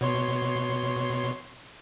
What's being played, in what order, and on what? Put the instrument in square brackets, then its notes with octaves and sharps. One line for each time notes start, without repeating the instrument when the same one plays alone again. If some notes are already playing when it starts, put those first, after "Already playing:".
[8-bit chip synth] B2 C#5 C6